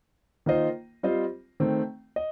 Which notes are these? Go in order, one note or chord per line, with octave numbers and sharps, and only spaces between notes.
D#3 A#3 F4 C5 D#5
G3 C4 F4 C5 D#5
D#3 A3 C4
D#5